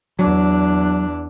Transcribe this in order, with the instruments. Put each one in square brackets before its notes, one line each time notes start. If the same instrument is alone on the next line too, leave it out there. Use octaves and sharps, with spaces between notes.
[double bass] E2 D4 [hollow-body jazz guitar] F#3